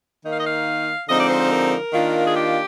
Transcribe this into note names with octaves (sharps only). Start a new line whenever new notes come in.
D#3 A#3 D#4
F5
D#5
F5
D3 F3 G#3 C4 D#4 D#5
D5
C5
C5
A#4
D#3 A#3 D4 F4
G#4
G4